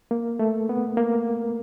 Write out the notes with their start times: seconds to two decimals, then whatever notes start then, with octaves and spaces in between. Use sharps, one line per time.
0.11 A#3
0.39 A3
0.69 B3
0.97 A#3